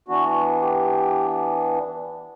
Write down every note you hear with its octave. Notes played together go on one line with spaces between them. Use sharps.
E3 B3 D4 F#4
G4